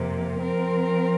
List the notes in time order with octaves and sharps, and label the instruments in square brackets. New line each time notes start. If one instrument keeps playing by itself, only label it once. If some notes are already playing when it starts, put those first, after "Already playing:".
Already playing: [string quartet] F2 C3 A#3
F3 C4 A#4